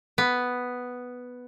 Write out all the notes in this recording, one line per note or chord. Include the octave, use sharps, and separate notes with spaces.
B3